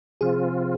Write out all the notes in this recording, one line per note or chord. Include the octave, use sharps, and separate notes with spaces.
C3 F3 C4 F4 G#4